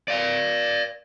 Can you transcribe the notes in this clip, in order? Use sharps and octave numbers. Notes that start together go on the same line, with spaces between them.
D5 F5